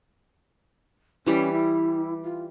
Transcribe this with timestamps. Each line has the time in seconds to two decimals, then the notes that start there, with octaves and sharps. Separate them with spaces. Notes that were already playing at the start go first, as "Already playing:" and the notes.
1.26 E3 G3 C#4
1.52 E4
2.23 F4